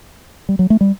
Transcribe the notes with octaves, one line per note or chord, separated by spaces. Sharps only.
G3
F#3
A3
G3